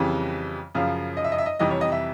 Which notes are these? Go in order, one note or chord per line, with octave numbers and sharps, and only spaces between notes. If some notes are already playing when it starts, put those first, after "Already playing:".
Already playing: F2 C#3 E3 G3
F#2 C#3 F3 F5
D#5
E5
D#5
E5
D#5
F2 C3 E3 G3 D#5
C#5
D#5
E5